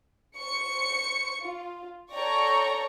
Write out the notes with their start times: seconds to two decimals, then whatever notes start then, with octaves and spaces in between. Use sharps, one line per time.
0.37 C5 C#6 C#7
1.42 F4
2.12 A4 C#5 D5 G5 A#5 C#6